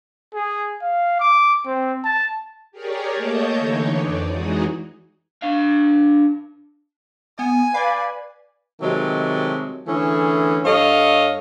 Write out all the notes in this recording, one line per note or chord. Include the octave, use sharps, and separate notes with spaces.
G#4
F5
D6
C4
A5
G4 G#4 A#4 C#5 D5
A3 A#3 C#5 D#5 A5 G6
D3 E3 D#4 C#5
F2 D5
E3 G#3 D#4 F#4 G#4 D#5
D4 F5
B3 G#5
B4 D5 F5
C3 D#3 F#3 G#3 A3
D3 E3 A3 C#4 G#4
G2 A4 C#5 D#5 F5